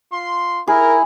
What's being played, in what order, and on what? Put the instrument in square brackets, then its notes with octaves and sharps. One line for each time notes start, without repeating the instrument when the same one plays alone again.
[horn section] F4 C6
[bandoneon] E4 [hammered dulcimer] G#4 [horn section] A#4